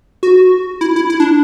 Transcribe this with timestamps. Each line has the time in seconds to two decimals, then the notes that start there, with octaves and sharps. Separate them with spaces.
0.23 F#4
0.81 E4
0.96 E4
1.10 E4
1.20 D4